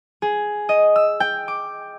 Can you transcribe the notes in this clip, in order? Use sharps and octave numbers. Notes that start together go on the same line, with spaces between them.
G#4
D#5
E6
G5
D6